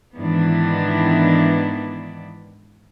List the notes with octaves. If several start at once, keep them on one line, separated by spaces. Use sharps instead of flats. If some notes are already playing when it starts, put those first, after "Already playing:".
G#2 D#3 E3 B3 D4 E4